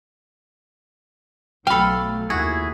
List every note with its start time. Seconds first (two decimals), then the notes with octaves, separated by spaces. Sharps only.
1.67 B1 F#3 A3 A4 F5 G5 B5
2.30 F1 D#2 E4 F#4 G#4